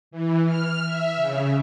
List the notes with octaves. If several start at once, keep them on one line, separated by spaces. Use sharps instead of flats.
E3
F6
E5
C#3